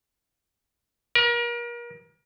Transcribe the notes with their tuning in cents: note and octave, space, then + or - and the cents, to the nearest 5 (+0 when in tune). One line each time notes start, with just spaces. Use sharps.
A#4 +35